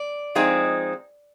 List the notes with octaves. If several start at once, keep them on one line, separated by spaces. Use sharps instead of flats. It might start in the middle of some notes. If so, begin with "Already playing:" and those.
Already playing: D5
F3 G#3 C4 D#4 G#4